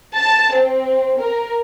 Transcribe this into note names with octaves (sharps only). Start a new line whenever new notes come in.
A5
C4
A#4